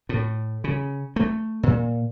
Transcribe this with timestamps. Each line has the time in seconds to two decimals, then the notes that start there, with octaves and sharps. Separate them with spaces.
0.09 A2
0.64 C#3
1.16 A3
1.63 A#2